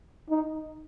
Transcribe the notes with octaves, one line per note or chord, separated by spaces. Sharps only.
D#4